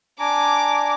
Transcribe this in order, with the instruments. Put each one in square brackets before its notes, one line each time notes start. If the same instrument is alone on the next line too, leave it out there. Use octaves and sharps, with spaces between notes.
[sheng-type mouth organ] D4 G#5 A#5 [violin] D6